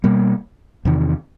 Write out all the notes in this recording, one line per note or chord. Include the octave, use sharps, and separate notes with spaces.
B2 G3 A#3
E2 C3 D#3